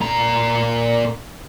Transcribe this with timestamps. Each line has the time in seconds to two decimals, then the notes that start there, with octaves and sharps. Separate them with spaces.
0.01 A#2 A#5